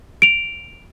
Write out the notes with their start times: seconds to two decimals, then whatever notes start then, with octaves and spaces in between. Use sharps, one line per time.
0.22 D7 F7